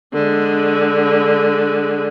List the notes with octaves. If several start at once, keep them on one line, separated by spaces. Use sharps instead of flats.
D3 G#3